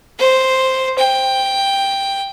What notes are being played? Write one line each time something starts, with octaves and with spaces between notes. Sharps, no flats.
C5
G5